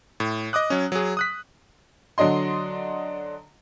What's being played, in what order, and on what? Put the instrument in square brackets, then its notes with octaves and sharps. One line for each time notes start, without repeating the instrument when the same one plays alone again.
[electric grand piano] A2
D#5 D6 D#6 F#6
F#3 C#4
F#3 G#4
D#6 F#6 B6
[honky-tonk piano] D3 F#3 D4 D#5 C6